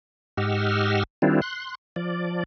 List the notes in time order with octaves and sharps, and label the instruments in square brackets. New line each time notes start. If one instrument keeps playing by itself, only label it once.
[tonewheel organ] G#2 G4 D#5 F#5 E6 F6
D#3 G3 C4 D4 E4 F4
C6 F#6
F3 D5